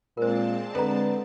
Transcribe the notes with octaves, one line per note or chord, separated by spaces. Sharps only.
A#2 G#3 C4 A#4 C5 A5
D3 A4 B4 A#5